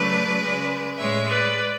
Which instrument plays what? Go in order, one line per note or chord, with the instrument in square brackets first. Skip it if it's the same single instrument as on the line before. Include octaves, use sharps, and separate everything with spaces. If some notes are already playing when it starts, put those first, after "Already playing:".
Already playing: [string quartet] C#3 F#3 A3 B4 D5
C#3 G#3
A2 G#3 C#5 E5
B4 D5